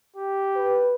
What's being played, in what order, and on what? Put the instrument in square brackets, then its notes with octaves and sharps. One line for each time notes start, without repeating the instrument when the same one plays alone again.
[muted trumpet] G4
[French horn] B4